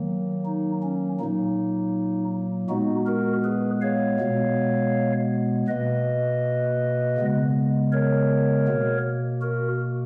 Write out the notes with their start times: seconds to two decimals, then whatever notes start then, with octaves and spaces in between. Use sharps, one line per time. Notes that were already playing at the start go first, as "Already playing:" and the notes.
Already playing: D#3 F#3 A#3
0.45 D#4
0.83 C#4
1.20 A#2 F#3 A#3 D#4
2.69 A#2 G#3 B3 D#4 F#4
3.06 F#4 A#4
3.44 G#4 B4
3.81 C#5 F5
4.20 B2 G#3 B3
5.68 B2 A#3 B4 D#5
7.18 C#3 G#3 B3
7.92 A#4 C#5
8.67 B2 A#3
9.42 F#4 A#4